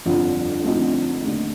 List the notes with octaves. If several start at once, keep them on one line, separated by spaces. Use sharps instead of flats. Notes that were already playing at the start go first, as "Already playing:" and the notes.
G1 F2 D3 F3
D2 D3 F3 C4 D#4
D#2 D3 A3 D#4